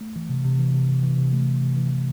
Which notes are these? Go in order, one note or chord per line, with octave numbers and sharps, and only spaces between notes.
A3
E3
C3
C3
E3
C3
C3
E3
C3
A3
C3
C3
E3
E3